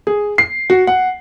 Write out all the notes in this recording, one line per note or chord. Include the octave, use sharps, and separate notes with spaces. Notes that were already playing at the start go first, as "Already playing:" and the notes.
G#4
C7
F#4
F#5